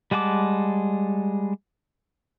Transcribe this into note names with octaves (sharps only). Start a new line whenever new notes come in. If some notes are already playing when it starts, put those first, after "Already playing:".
G3 G#3 F#5 A5 D6